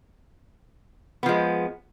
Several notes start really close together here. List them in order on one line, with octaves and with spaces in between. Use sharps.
B3 F3 G#3